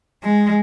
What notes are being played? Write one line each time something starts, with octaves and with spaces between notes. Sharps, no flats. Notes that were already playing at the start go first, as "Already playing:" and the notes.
G#3